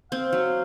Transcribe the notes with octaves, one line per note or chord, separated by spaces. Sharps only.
C4 F5
F#3